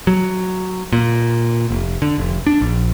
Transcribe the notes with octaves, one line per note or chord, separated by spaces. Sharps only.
F#3
A#2
F1
D3
F1
D4
A#1